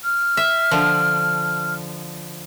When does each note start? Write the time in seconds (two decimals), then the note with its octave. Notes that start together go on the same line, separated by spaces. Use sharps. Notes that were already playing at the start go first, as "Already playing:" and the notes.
0.04 F6
0.37 E5
0.71 D3 F3